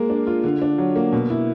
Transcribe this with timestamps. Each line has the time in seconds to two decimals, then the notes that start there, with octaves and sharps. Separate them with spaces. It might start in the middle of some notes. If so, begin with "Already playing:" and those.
Already playing: G#3 A#3 A#4
0.10 D4
0.27 F4
0.44 D3
0.62 D4
0.78 F#3
0.96 A#3
1.12 B2
1.30 E4